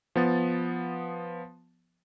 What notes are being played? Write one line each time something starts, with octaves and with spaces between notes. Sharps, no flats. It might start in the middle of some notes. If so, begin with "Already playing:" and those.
F3 B3 A6